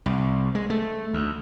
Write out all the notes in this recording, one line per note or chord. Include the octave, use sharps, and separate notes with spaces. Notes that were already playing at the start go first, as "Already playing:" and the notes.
C2
G#3
A3
D2